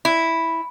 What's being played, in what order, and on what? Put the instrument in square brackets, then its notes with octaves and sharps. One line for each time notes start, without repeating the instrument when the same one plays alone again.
[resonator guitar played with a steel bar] E4